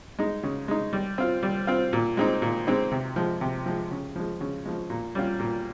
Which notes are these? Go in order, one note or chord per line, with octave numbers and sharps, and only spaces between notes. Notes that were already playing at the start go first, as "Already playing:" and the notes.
G#3 D#4
C#3
G#3 D#4
G3
C4 F4
G3
C4 F4
A#2
G#3 C4 D#4
A#2
G#3 C4 D#4
C3
F3 G#3
C3
F3 G#3
C#3
F3 G#3
C#3
F3 G#3
A#2
G3 C#4 F4
A#2